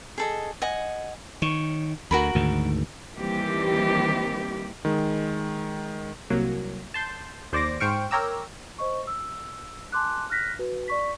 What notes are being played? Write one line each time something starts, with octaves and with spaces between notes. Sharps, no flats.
G#4 A4 D#5
D#5 F#5 G#5
D#3 C#5
D2 F#4 A#4 B5
D2 G#2 D#3
D#3 E3 G3 A#3 C4 G4
D#3 G#3
C2 F#3 A#3
A5 C6 G6
D#2 C5 D5 D6 A#6
G#2 C5 G5 C#6 F6 D7
A#4 C#5 G5 A#5 D6 E6
C5 D#5 C#6
E6
G#5 A5 C6 D6 F#6
F6 F#6 A#6 B6
F#4 B4
D5 C#6 B6